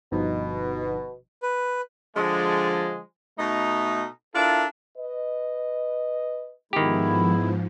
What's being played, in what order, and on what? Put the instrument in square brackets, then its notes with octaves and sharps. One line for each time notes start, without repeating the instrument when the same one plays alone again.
[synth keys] G1 F3 D#4 [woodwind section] B2
[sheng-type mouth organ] B4
[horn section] D3 F3 G#3
B2 A3 D#4
D4 E4 F4 A4 A#4
[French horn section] B4 D#5
[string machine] G#2 F3 [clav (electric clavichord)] D#3 G4 [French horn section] G#3 B3 [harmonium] E4